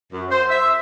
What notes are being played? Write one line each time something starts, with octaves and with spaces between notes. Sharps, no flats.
F#2
C5
E5